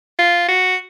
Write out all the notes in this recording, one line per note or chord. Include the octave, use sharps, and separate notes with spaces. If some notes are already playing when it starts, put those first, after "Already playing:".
F4
F#4